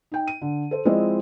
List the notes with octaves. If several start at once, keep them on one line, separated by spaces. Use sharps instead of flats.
D#4 G5
D#7
D3
A4 C5
F3 G#3 C4 E4 D5 D#5